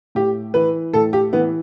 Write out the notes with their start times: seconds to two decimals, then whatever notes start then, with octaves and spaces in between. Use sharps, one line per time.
0.15 A2 G4
0.54 E3 B4
0.93 A2 A4
1.13 G4
1.33 E3 B3